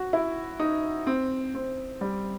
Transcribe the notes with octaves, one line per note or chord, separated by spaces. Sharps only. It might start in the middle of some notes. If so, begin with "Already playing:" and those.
Already playing: F#4
E4
D#4
C4
C4
G3